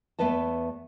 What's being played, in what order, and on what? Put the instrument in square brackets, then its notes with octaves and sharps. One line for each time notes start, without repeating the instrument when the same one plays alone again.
[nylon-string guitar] E2 A3 B3 B4 D#5 A5